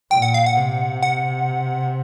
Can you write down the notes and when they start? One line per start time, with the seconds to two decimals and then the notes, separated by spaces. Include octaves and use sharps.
0.11 A#2 G5
0.22 F#5
0.34 F5
0.46 F#5
0.57 C3
1.03 F#5